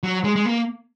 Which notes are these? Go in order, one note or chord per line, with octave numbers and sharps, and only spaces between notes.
F#3
G#3
G#3
A#3